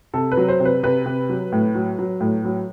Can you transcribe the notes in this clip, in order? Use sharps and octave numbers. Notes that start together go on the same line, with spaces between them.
C3 A4
B4
F#3
C5
C3
B4
C3 B4
C3
F#3
A2
F#3
F#3
A2
F#3